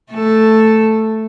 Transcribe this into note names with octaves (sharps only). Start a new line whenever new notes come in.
A3 A4